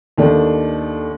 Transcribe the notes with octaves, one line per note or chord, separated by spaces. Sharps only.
D#2 D#3 A3 D4